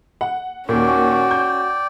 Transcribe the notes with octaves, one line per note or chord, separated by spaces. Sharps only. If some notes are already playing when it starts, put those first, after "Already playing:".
F#5
D#2 A#2 C#4 F#4 D5 G5
G6